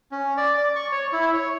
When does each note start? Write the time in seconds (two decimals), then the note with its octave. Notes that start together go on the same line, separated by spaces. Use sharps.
0.12 C#4
0.37 D5
0.57 D5
0.76 C#6
0.92 C#5
1.13 E4
1.34 C#5